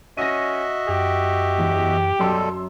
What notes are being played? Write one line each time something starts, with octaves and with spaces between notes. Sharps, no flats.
C#4 F#4 D#5 E5 A#6 D#7
F#2 G4
E2
F#2 B2 G3 A4 C6 E6